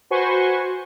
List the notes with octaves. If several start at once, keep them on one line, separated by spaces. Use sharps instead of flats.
F#4 B4 C5 G#5 C6 C#6